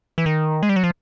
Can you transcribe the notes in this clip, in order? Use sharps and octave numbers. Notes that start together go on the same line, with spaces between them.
E3
D#3
G#3
G3
F#3
F3